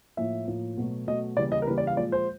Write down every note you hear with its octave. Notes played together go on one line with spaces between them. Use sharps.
A2 F3 A#3 E5
A2 F3 A#3
B2 F#3 A3
B2 F#3 A3 D#5
C#3 E3 G3 A#3 D5
D#5
A#4
C#3 E3 G3 A#3 B4
D5
F5
A#2 F3 G#3 D5
C5